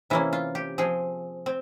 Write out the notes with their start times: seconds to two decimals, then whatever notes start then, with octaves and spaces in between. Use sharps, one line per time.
0.10 C3 E3 A#3 C#4 E4
0.33 F4
0.55 G4
0.78 F3 C4 G#4
1.46 C4